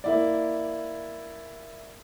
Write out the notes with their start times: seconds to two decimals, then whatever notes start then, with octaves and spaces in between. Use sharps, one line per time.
0.04 A#3 E4 D5